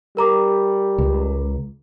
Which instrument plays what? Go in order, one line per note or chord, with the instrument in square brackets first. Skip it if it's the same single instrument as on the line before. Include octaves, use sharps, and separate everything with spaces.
[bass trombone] G3 [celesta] A#4 A#5 D6
[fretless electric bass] C#2